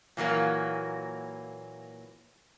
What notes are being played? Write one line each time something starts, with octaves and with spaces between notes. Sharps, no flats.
A#2 E3 F#3 A#3